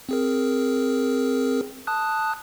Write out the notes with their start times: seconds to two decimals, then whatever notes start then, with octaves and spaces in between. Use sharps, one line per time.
0.09 C4 G#4 A#4
1.87 A5 D#6 F#6